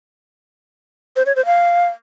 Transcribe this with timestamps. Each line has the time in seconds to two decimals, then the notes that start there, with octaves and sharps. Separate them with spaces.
1.16 C5
1.26 C#5
1.36 C5
1.46 F5